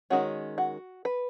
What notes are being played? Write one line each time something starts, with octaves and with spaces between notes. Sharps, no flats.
D#3 G#3 C#4 F#4
F#4
B4